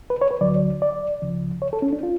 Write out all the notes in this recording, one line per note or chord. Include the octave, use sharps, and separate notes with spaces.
B4
C#5
B4
D2 D3 F#3 D5
D5
C#2 C#3 F3
C#5
A4
C#4
D4
F4